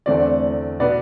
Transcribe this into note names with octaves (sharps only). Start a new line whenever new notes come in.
E2 D3 A3 C4 D5
B2 B3 D5